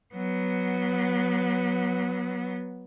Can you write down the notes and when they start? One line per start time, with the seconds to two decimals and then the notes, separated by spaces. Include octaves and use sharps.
0.15 F#3 B3